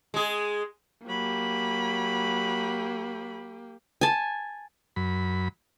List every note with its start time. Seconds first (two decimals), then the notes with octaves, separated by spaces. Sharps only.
0.14 G#3 G#4
1.07 F#3 A#3 G4 B5
4.01 G#5 A5
4.96 F#2 B5